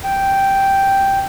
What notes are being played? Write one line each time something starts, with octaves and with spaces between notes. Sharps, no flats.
G5